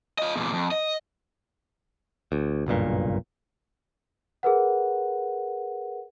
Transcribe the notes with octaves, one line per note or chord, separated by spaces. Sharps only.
F4 D#5
E2 A#2
F2
D#5
D2
F#1 B1 G2 A#2
G#4 A#4 B4 F#5